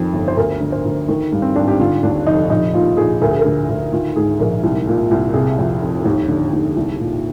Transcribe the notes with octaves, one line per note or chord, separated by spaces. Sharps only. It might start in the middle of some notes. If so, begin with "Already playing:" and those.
Already playing: F2 D#3
G1
C5
D2 A#4
D3
C5
D2
D#3 A#4
G2
C4
G#1 D4
G4
D3 F4
D#2 D4
F1 D#4
A#1 D#4
A#2 F4
A#1 G#4
D2 A#4
G#4
A#4
D3
D2
D#3 F4
G#2 G#4
A#1 A#4
C2
A#2
C2
C3 G#4
F2
F1
D#2
D3
D#2
C2
A#2